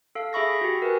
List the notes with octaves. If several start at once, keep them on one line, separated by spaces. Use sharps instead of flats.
A4 F5
G#4 E5 B5 C#6 A#6
F#4 G4
A#4 B4 G#5